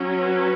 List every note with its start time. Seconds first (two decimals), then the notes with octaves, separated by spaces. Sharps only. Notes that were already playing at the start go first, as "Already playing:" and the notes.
Already playing: F#3 C#4
0.23 B4